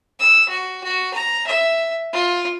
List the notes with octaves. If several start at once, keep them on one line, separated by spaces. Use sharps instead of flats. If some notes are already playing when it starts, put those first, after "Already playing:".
E6
F#4
F#4
A#5
E5
F4